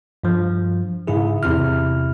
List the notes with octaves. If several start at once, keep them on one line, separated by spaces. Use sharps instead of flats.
G2 F3
G#2 C#3 E4 G#4
E2 C3 E4 F6